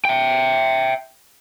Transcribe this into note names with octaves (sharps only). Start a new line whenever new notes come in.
E5 G5